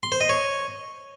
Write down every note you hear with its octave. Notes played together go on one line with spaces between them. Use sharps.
C6
C5
D#5
C#5